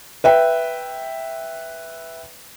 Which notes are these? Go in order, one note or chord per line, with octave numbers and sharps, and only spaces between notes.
B4 E5 G5